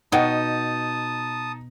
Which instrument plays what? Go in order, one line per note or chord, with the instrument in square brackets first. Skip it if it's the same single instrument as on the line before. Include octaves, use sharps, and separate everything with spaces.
[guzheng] B2 [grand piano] D#4 [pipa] C#5 F#5 G5 [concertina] A5 D#6